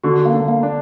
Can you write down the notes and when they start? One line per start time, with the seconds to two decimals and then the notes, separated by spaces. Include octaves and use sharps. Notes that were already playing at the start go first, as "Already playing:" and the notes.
0.04 D3 F#4
0.26 A#3
0.33 D3
0.48 A#3
0.63 D4